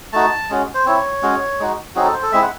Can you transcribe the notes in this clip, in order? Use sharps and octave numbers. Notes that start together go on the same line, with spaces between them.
A3 D#4 F#4 A5
G#3 C#4 F#4
C5
C4 E4 C#5
G#3 C#4 F#4
G#3 D#4 F#4
F#3 C4 D#4 F#4 G#4
A4
C5
A4
G#3 C4 E4 E5
F#5